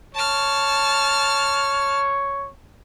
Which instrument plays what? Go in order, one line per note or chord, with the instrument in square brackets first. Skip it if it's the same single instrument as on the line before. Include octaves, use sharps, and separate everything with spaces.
[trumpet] C#5 [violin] A5 F6